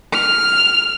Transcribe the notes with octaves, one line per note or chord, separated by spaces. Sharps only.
F6